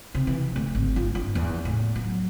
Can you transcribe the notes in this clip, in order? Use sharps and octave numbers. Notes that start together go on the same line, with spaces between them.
C3
E3
D2
G#1
F4
G2
E2
A2
F#3